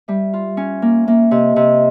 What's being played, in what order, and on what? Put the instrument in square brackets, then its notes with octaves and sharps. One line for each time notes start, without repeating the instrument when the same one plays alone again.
[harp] G3 [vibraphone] E5
[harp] F4
C#4
A#3
[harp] A#3 [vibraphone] E5
[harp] C3 [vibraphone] D#5
[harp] C3 [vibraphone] D#5